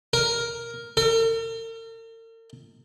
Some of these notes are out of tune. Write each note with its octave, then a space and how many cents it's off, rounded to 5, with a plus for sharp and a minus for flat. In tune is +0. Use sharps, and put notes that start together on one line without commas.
A#4 +5
A#4 -45